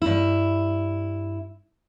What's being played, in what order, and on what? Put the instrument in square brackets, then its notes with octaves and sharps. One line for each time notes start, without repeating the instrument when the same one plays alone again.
[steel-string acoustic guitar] G2 E4